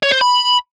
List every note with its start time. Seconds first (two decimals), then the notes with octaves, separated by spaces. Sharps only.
0.03 C#5
0.12 C5
0.21 B5